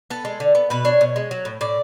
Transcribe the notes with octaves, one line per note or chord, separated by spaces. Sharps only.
B3 A4
G#3
D3
B3
B2 B4
D4 C#5
B2
G#3
F#3
A2
A2 D5